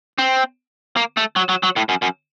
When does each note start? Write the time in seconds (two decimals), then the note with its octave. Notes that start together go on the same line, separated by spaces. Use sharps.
0.18 C4
0.97 A#3
1.17 A3
1.36 F#3
1.49 F#3
1.63 F#3
1.76 A2
1.89 F#2
2.02 F#2